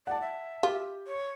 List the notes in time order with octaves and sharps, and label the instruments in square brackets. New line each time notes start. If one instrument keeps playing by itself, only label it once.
[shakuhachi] D5 [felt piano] F#5 A5
[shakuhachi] E5
[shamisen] F4 [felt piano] G4
[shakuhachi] C#5